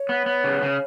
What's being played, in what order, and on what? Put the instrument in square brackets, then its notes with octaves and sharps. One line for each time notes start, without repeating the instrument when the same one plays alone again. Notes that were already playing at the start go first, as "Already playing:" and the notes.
Already playing: [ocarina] C#5
[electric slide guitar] B3
B3
C#3
C#3